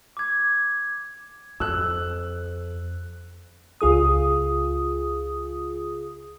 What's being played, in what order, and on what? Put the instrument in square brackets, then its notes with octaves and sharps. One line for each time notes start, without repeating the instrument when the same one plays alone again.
[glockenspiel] D6 G#6
[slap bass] F2 [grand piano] E6 F#6
[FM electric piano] C#2 F4 G#4 D#6